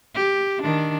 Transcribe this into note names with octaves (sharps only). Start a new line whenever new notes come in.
G4
D#3 D4